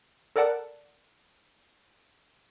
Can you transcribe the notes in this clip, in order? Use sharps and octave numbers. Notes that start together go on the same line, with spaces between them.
A4 A#4 D5 F#5 A5